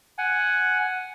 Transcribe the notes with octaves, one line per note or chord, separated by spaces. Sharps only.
F#5 G#5